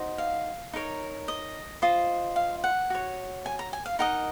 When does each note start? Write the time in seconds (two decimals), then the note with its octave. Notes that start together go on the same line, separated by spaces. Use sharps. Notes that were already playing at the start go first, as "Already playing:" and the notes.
Already playing: D#4 F#4 C5 D#5
0.18 F5
0.73 D#4 A#4 C#5
1.28 D#5
1.82 F4 C5 D#5
2.36 F5
2.64 F#5
2.90 F#4 C#5
3.46 G#5
3.59 A#5
3.73 G#5
3.86 F5
3.99 D#4 A#4 D#5 F#5